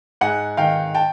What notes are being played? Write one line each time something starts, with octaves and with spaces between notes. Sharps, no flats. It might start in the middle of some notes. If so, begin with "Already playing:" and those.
G#2 F#5 G#5
D#3 F5 G5
G5 A5